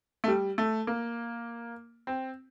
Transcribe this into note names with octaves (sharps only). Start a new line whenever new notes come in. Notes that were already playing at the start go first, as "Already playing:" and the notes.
A3
G3
A3
A#3
C4